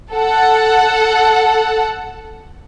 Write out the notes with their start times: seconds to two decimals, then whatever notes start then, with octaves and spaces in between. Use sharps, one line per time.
0.12 A4 F#5